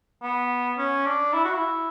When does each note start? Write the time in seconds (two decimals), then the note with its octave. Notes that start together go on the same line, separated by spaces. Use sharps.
0.22 B3
0.78 C#4
1.06 D4
1.33 E4
1.45 F#4
1.54 E4